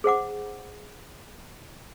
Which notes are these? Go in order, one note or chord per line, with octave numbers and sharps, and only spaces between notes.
G#4 C5 F#5 D6